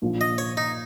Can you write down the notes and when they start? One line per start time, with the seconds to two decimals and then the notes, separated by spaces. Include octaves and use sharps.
0.02 A#1 A#2 F3
0.21 D#5
0.38 C#5
0.57 D#4